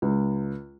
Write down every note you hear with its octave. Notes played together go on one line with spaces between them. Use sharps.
C#2